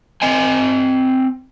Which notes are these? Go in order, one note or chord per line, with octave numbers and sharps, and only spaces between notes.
C4 D#5 G#5